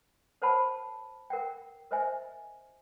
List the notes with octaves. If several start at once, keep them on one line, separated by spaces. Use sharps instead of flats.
A#4 C5 C#5 F#5 A5 B5
A#4 F#5 G5
A#4 C5 D#5 E5 G#5